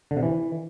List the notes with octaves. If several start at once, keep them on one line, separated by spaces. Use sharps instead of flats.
D3
C3
E3